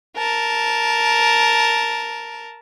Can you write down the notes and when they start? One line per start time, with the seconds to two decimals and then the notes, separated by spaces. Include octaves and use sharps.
0.17 A#4 A5